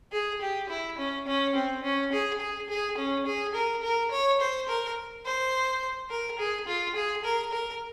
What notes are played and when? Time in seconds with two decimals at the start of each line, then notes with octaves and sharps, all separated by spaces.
0.12 G#4
0.41 G4
0.69 E4
0.98 C#4
1.27 C#4
1.55 C4
1.83 C#4
2.12 G#4
2.40 G#4
2.69 G#4
2.98 C#4
3.26 G#4
3.55 A#4
3.83 A#4
4.11 C#5
4.40 C5
4.69 A#4
5.25 C5
6.10 A#4
6.39 G#4
6.67 F4
6.95 G#4
7.24 A#4
7.53 A#4